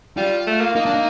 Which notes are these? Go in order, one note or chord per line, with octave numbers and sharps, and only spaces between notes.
G3 F4
A3
A#3
A#3 D#4
D4
D#4